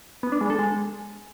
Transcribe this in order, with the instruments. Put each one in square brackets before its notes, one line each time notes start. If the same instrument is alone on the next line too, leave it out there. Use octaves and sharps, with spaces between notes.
[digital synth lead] B3
D4
G#3
A4
G#3